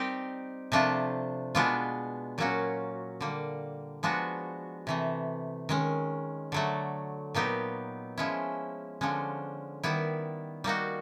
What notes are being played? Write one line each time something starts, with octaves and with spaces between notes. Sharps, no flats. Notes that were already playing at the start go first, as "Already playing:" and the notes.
Already playing: G3 C4 D#4 G4
C3 F3 A3 D4 F4
B2 G#3 B3 D4 F4
A#2 F#3 A#3 C#4 F#4
D3 G3 A#3
F3 G#3 B3 D4 F#4
C3 E3 A3
D#3 G#3 C#4
D3 F#3 A3
A#2 F#3 B3 D#4 G4
F3 G#3 C#4 E4
D3 F3 G#3 C#4
D#3 G3 B3 E4
G3 A#3 D#4 F#4